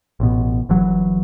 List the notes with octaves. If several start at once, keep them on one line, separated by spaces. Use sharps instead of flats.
A1 B2
G1 E3 F#3